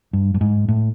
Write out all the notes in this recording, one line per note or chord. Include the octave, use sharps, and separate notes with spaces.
G2
G2
G#2
A2